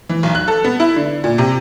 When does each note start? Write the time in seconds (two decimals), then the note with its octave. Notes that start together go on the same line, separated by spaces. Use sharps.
0.09 E3
0.23 B1
0.35 F#6
0.48 A4
0.64 B3
0.80 E4
0.96 D3
1.24 A#2
1.38 C3